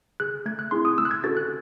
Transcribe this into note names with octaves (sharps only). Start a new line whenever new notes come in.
G#4 F#6
A3 G#6
F#6
C4 E4 G#4 C6
D#6
A3 E6
F#6
G#6
C#4 F#4 A4 A6
F#6